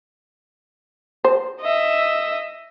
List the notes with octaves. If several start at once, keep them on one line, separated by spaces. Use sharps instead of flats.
C5
D#5 E5